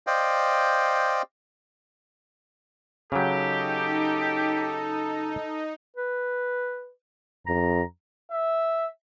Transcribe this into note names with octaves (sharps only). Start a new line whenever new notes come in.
C5 D5 D#5 F5 G5
C#3 F#3 D#4 G4 A4
B4
F2 A#5
E5